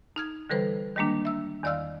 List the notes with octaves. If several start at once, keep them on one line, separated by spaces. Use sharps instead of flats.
D#4 F6 G#6
D3 E3 G3 A4 B4 C5
D#3 G3 G#3 A#3 D4
E5 E6
E2 D#3 D5 F5 E6 F6